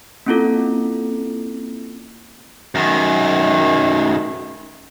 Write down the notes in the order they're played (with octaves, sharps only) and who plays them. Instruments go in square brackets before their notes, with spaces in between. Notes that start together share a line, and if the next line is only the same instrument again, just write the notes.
[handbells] A#3 C4 C#4 E4 F4 A4
[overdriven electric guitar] F#2 D#3